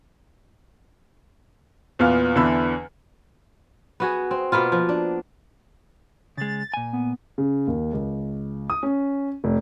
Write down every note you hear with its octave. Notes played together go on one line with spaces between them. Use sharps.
E2 A#2 B3 F5 F6
E2 D3 E3 B5 E6
B3 F#4 G#4
C4
B2 A#3 B3 F4
F3
D4
C#3 G#3 A6
A#2 G#5
B3
C#3
D#2
C#2
D#6
C#4
F1